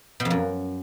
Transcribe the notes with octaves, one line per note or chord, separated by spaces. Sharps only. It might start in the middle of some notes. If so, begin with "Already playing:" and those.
B2
F2
F#2